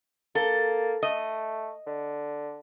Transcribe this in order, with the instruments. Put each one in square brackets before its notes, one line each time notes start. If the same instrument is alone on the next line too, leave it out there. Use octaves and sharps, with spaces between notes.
[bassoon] A#3 [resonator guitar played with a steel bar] A4
[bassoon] A3 [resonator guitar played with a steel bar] D#5
[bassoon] D3